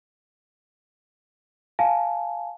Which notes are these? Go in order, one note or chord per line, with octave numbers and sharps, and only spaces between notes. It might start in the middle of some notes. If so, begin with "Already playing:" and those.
F5 G#5 A5